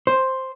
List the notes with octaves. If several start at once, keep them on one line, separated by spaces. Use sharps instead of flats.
C5